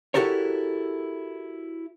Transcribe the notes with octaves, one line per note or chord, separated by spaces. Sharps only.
E4 F#4 G4 A4 A#4 C#5